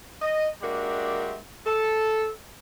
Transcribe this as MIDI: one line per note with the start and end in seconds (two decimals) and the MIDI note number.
0.22 0.47 75
0.62 1.36 56
0.62 1.36 58
0.62 1.36 62
0.62 1.36 66
0.62 1.36 67
0.62 1.36 76
1.65 2.29 69